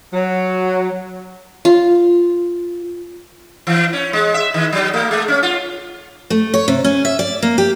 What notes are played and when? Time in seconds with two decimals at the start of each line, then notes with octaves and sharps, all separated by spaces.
0.13 F#3
1.65 F4
3.67 E3
3.93 C#4
4.13 G#3
4.34 E5
4.54 D#3
4.72 F#3
4.94 A3
5.11 G#3
5.28 C#4
5.43 F4
6.30 A3
6.54 C#5
6.68 C3
6.84 C#4
7.05 E5
7.19 D5
7.42 A#3
7.58 G4